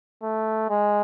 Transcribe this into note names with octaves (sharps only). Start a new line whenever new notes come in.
A3
G#3